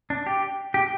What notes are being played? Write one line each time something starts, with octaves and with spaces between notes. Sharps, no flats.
D4
G4
G4